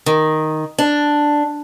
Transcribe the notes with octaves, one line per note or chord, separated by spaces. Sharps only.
D#3
D4